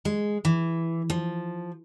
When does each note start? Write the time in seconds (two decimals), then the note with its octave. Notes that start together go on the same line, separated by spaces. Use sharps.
0.05 G#3
0.45 E3
1.10 F3